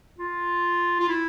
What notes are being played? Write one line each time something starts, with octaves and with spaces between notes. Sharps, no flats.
F4
F4
E4